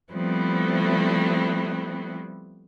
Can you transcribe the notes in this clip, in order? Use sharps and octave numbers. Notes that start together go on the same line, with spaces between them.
F3 G3 A3 B3 C4 E4